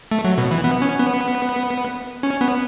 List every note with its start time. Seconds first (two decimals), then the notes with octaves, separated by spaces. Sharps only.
0.11 A3
0.25 F#3
0.38 B2
0.51 E3
0.64 B3
0.82 C#4
0.99 B3
2.23 C#4
2.41 B3